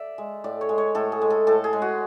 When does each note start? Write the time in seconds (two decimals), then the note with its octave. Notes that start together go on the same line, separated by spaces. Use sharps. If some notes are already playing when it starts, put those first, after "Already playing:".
Already playing: D5 E5
0.18 G#3
0.44 A2 D5
0.61 C#5
0.69 G#3
0.78 C#5
0.95 A2 A4
1.12 G#4
1.22 G#3
1.30 A4
1.47 A2 A4
1.64 G#4
1.73 G#3
1.82 F#4